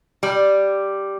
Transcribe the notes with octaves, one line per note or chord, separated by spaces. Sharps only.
G3